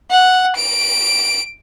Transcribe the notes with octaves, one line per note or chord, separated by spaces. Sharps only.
F#5
D7